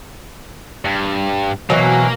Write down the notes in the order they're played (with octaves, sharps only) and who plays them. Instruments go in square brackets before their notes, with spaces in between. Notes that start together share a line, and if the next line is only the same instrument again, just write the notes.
[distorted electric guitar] G2
[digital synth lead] B2 [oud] E3 F#3 [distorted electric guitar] A#3